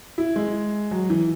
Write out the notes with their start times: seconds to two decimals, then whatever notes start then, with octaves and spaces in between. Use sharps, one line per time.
0.18 E4
0.36 G#3
0.91 F#3
1.10 E3